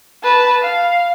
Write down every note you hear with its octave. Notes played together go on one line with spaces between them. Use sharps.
B4 A5
F5